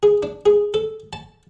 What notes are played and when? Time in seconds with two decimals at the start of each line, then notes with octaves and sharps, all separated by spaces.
0.03 G#4
0.23 D4
0.46 G#4
0.74 A4
1.13 A5